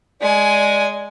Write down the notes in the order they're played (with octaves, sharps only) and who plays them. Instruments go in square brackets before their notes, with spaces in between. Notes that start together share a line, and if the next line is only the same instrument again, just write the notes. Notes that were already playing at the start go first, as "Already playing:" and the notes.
[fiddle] G#3 G#5 [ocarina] D5